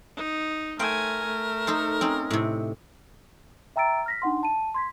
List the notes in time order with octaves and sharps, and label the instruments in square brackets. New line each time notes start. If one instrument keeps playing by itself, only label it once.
[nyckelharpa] D#4
[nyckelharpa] A3 G#5 [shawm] A#4 [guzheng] C5 G5
[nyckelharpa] A3
[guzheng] D#4 A4 C5
C4 C#4 D#4
A2 C3
[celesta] E5 G5 A#5 E6 A6 D7
F6 A#6 B6
D4 D#4 F#5 C6
A5 D#7
C6 G#6 B6